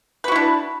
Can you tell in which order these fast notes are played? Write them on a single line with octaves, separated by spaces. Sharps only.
B4 F#4 E4 D4